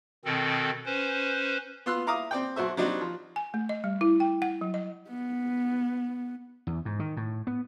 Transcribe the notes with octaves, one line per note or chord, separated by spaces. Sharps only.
B2 D#3 C4 A4
C#4 B4 C5
B3 F4 C6 E6 F#6
E4 F5 A#5 D6 D#6
C4 D5 G5
B1 F#4 C5 E5
F#3 G3 C4 D4 D#4 F#4
F3
G#5
A3
D#5
G3
E4
G5
F#5
F#3
D#5
B3
E2
G#2
D#3
A2
B3